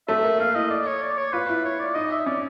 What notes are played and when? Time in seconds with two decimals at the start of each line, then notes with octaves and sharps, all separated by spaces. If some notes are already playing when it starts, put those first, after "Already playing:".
0.08 A3 E5
0.24 A#3
0.40 A#3 F5
0.55 E4 D#5
0.71 D5
0.87 C#5
1.02 D5
1.18 C#5
1.33 F4 B4
1.49 E4
1.65 C#5
1.80 D5
1.95 D#4 D#5
2.11 E5
2.26 C#4 D5